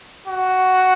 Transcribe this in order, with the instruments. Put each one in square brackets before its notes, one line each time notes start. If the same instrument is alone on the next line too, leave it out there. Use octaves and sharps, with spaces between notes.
[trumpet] F#4